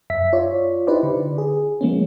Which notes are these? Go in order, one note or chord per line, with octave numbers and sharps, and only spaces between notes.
F#2 E5 B6
F4 C#5 D5
D#4 E4 G4 B4 C5 D5
D3
G#4
F3 G#3 A#3 B3 C#4